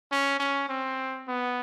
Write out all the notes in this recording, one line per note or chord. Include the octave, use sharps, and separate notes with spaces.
C#4
C#4
C4
B3